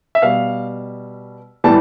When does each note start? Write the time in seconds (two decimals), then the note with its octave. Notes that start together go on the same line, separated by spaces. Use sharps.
0.15 E5
0.22 B2 G3 F5
1.64 A2 E3 G3 A5